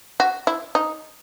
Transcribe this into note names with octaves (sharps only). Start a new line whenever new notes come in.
F#4
E4
D#4